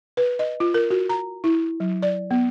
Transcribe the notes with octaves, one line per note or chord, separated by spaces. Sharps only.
B4
D#5
F4
A#4
F#4
A#5
E4
F#3
D5
B3